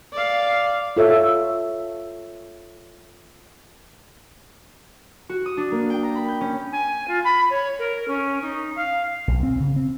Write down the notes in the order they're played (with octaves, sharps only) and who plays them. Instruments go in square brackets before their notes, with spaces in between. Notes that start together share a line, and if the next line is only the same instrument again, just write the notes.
[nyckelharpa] D5 F5
[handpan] F4 A4 C#5 E5
[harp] F#4
D#6
D4
A#3
G5
A#5
B5
G6
C#4
[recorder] G#5
F4
B5
C#5
A#4
C#4
D#4
F5
[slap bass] B1
C4
C#3
C4